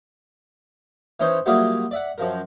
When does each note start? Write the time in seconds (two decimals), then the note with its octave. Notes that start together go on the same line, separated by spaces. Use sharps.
1.20 E3 C#4 D#4 C5 C#5
1.46 F#3 G3 A#3 E4 F4 G#4
1.91 D5 E5 F#5
2.18 F#2 F3 A#4